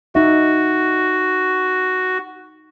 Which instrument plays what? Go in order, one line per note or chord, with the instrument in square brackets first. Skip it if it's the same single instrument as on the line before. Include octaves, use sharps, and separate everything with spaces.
[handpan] D#4 E5 [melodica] F#4